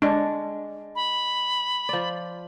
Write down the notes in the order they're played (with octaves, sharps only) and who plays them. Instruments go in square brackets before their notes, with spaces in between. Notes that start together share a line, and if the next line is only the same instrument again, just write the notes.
[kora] G#3 [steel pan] D4
[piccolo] B5
[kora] F3 D5